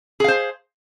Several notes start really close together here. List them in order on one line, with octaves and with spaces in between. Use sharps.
G#4 F5 C5